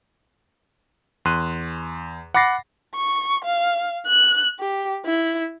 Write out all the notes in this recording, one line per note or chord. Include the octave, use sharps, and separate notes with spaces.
E2 C6 F#6 D#7
F#5 B5 D6 A6 A#6 C7
C#6
F5
F#6
G4
E4